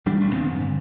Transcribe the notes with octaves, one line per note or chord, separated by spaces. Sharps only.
D#1 E2 G3 D4
E1 B1 A3 D4
G#1 D#3 B3 C4
F2
G2 D3